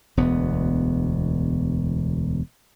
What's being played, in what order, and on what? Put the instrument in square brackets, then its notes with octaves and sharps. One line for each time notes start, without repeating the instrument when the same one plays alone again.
[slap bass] E1 D2 B3